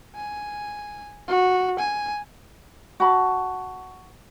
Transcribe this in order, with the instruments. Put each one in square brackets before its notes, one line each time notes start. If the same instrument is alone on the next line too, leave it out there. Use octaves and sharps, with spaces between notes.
[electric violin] G#5
F#4
G#5
[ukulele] F#4 A5 B5